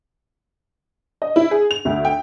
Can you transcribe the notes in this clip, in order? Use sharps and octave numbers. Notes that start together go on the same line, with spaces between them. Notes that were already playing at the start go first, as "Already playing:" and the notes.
D#5
E4
G#4
F7
D2
G5